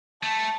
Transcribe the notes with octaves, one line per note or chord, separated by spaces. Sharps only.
A3 A5